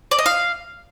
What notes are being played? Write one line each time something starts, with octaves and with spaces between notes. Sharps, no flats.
D5
D#5
F5